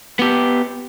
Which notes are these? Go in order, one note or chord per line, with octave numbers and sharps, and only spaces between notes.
B3 G4